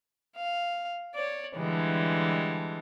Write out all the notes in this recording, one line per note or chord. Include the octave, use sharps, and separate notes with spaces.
F5
C#5 D5
D3 E3 G3 G#3